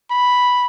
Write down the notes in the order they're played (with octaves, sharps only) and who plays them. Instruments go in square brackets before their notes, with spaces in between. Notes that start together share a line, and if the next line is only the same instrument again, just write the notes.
[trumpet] B5